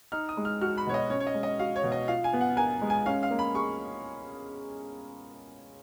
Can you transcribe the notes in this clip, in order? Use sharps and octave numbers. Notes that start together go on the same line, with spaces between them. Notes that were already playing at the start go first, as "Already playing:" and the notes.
D#4 F6
D#6
G#3
F6
F#4 F6
B5
B2 C#5
D#5
C#4 C#5
C#5
D#5
G#3
D#5
F#4 F5
C#5
B2
D#5
F4 F5
G#5
B3
F#5
A#4 G#5
G#3
G#5
C#4 F5
F5
A#3
B5
G#4 C#6